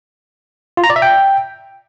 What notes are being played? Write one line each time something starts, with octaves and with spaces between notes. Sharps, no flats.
F4
A#5
D5
E5
G5